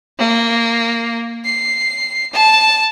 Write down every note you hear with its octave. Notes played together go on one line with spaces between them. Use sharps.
A#3
C7
A5